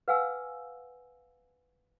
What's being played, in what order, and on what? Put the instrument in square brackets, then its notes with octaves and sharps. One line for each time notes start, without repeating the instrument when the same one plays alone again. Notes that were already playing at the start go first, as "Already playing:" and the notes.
[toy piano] B4 F5 F#5 G#5 E6